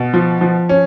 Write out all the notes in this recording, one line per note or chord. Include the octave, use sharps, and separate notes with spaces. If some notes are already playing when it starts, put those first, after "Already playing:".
Already playing: B2
F3
F3
C#4